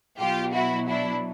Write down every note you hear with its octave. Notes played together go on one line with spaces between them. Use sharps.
B2 F#3 F4 G4
E4 F#4
D4 E4